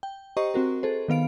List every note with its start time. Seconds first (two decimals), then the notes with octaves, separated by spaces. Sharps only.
0.03 G5
0.37 G4 C5 D#5 A#5 C#6
0.54 C4 F#4 A#4
0.83 G#4 A4 C5
1.08 D#3 B3 F5 D7